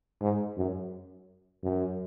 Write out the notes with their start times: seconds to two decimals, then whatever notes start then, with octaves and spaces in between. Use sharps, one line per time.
0.21 G#2
0.57 F#2
1.63 F#2